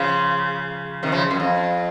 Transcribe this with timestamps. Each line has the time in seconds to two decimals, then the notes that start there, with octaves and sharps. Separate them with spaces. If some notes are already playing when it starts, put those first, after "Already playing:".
Already playing: C#3 F3
1.03 C3 D#3
1.12 C#3 F3
1.31 F#2
1.40 F2